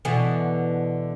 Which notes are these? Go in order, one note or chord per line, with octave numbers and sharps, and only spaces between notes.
B2 D3 E3